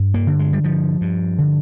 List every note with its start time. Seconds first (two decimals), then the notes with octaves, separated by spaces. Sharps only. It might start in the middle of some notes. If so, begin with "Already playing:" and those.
Already playing: G2
0.14 A#3
0.27 D3
0.39 G#3
0.53 G3
0.64 G2 F3
1.01 G2
1.39 D3